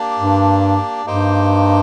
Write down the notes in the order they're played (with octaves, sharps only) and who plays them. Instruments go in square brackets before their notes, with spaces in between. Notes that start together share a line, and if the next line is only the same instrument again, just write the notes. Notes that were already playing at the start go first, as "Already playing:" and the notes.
Already playing: [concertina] A#3 D4 G4 D5
[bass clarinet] G2
[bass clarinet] G2 [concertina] A#3 D#4 G4 C5 G5